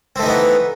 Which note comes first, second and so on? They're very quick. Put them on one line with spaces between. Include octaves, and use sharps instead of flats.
C4 A3 D#4 E3 B3